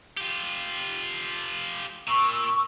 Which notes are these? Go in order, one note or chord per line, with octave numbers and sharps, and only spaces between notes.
F4 G4
A#2 C#6 E6